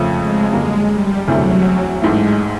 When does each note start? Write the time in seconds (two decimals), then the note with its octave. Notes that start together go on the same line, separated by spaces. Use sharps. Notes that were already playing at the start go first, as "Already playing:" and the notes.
Already playing: F2 C#3 F3 A3
0.15 G#3
0.52 F#2 D3 G3 G#3 A#3
0.90 G3
1.27 E1 D2 C3 E3 F#3 A3
2.02 A1 G#2 E3 G#3 A3